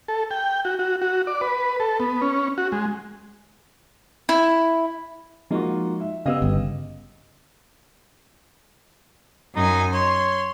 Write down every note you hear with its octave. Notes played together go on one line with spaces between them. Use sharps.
A4
G5
F#4
F#4
F#4
D5
B4
A4
B3
C#4
F#4
G#3
E4
F3 G#3 A#3 D#4 F4 F#4
E5
C#3 B3 G4 D#5 F5 E6
G1
F#2 D#4 G#5
C#5 C6